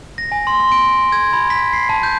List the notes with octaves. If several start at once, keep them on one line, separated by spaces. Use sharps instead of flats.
A#6
G#5
C6
C6
D7
G#6
B5
B6
C7
A5
G6